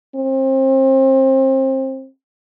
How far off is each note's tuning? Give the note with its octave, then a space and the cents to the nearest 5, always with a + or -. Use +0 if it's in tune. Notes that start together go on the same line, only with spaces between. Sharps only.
C4 +30